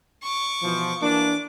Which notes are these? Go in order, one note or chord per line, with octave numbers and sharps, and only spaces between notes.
C#6 D6
B2 E3 F3
E3 A#3 D4 D6